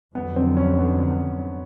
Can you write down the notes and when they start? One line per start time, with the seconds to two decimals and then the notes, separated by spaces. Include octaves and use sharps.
0.15 F2 D3 F#3 B3
0.36 C4
0.57 C#4
0.79 B3
1.10 B3